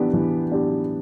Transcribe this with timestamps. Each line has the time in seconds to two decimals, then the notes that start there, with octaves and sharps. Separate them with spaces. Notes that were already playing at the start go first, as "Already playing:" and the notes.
Already playing: E3 B3 D4 G4
0.14 E3
0.51 B3 D4 G4